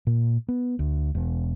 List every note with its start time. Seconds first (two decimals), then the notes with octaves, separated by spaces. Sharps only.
0.07 A#2
0.49 B3
0.79 D2
1.15 E1